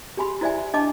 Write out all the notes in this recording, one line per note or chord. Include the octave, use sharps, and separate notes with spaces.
G4 G#4 G#5 B5 C6
E4 C5 D5 E5 G#5
D4 D#5 A5 D6